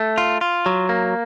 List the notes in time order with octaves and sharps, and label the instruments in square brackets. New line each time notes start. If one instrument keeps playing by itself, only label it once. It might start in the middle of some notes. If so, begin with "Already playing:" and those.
Already playing: [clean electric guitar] A3
F4
F4
F#3
A#3